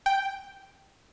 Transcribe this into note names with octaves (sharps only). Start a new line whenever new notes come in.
G5